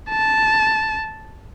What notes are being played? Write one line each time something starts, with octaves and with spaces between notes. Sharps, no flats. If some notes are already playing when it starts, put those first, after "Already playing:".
A5